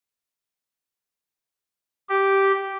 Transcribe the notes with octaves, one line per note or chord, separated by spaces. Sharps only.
G4